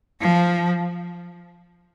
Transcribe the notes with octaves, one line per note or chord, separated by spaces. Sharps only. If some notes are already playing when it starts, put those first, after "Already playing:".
F3